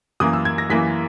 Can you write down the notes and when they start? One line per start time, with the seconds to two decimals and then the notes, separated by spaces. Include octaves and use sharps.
0.20 F#2 E3 A#3 D#6
0.33 E6
0.45 G#6
0.58 A#6
0.70 F#2 E3 A#3 B6